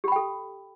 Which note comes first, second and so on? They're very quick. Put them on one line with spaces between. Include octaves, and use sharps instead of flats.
G4 B5 G5 A4